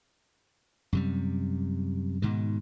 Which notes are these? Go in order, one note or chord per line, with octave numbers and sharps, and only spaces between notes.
F#2 C3 G3
G#2 B2 D#3